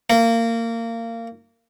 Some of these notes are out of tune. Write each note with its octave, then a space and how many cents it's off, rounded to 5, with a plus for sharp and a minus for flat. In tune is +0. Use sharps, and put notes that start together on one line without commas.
A#3 -25